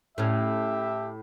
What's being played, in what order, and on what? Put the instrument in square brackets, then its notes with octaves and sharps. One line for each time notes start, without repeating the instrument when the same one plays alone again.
[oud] A2 C#4 [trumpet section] G4 E5